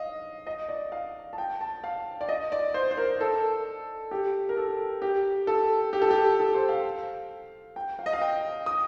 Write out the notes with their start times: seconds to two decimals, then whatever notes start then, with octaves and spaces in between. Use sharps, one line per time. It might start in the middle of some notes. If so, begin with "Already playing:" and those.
Already playing: D#5 F5
0.47 D#5
0.69 D5
0.92 F5
1.33 A5
1.38 G5
1.61 A5
1.84 F5
2.21 D5
2.29 D#5
2.52 D5
2.74 C5
2.91 C5
2.97 A#4
3.20 A4
4.11 G4
4.49 A#4
4.57 A4
5.02 G4
5.47 A4
5.93 G4
6.02 A4
6.11 G4
6.40 A4
6.54 C5
6.69 F5
7.76 G5
7.99 F5
8.06 D#5
8.13 F5
8.22 G5
8.66 D#6